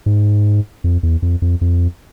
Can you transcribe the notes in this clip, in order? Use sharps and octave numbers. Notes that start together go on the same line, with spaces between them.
G#2
F2
E2
F2
F2
F2